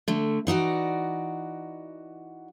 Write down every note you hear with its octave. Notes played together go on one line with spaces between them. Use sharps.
D3 A3
E3 D#4 F#4 D5